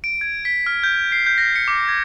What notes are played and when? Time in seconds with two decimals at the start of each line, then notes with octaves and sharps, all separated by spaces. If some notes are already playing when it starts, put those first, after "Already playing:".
0.04 D7
0.21 G#6
0.45 B6
0.66 F6
0.83 G6
1.12 C7
1.26 G6
1.38 A#6
1.56 C#7
1.68 D6
1.88 G#6